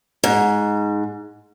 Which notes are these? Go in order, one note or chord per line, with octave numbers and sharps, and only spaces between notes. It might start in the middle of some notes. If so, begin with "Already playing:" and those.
G#2